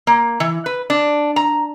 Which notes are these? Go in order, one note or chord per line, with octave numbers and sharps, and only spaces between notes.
A#3
E3
B4
D4
A#5